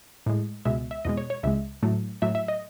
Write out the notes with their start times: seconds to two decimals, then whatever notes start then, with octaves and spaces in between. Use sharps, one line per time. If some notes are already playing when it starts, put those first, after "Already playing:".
0.26 A2 G#3
0.65 C#2 B2 G#3 E5
0.91 E5
1.05 E2 B2 G#3 D#5
1.17 C#5
1.30 C#5
1.43 C#2 C#3 G#3 E5
1.83 A2 F#3 A3
2.22 A2 F#3 A3 E5
2.35 E5
2.48 D#5